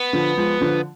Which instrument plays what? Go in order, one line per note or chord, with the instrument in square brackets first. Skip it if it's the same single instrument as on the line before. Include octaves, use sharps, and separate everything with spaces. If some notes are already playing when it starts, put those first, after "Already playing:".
Already playing: [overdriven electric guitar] B3
[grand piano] D3 F3
F3 G#3
D3 F3